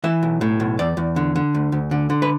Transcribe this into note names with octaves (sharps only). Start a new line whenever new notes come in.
E3 E5
B1
A2
B1
E2 D5
E2
D3
D3
D2
D2
D3
D3
B4